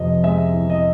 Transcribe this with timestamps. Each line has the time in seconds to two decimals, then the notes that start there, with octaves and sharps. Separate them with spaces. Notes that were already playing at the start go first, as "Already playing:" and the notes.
Already playing: F2 C3 E3 D#5
0.24 G#3 E5
0.54 E3
0.70 D#5